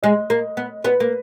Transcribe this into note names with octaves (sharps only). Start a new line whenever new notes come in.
G#3 D#5
A#3
B3
B3 B4
A#3